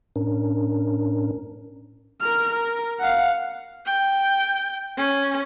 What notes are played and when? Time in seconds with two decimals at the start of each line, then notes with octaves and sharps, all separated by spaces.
0.16 A2 C#4 D4 A#4
2.21 A#4 F6
2.53 A#4
3.00 F5 F#5
3.85 G5
4.97 C#4